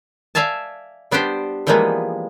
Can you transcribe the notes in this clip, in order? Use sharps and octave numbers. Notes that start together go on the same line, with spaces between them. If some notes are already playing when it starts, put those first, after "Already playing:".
D5 E5 F5 G#5 A5
G3 B3 D4 G4 C5
E3 F3 G3 G#3 A#3 B3